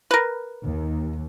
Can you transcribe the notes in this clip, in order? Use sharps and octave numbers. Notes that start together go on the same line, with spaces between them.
A#4 B4
D#2